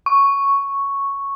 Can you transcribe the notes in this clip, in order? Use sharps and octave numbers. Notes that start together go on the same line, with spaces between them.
C#6